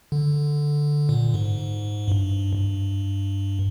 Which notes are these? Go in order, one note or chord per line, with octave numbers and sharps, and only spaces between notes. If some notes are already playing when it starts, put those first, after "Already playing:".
D3
A#2
G#2
G2
G2